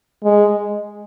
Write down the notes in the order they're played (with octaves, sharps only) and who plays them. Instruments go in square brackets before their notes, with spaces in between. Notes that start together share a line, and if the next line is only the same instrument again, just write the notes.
[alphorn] G#3